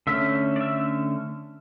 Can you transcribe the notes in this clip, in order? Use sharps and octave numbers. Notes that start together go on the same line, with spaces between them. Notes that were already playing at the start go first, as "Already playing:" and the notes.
D3 A3 C#4 E5
D5
E5